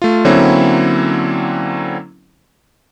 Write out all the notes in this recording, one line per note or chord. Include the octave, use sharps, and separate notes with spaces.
A3 F4
D3 F#3 A#3 C4 C#4 E4